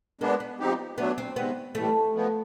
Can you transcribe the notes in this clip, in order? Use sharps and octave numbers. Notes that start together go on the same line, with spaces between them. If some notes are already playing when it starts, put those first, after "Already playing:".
G#3 A#3 B3 D4
B3
F3 G#3 C4 D#4 G4
F#3 A3 B3 D4
C4
C3 D#3 G#3 B3 C4
A2 E3 G3 A3
F3 G#3 B3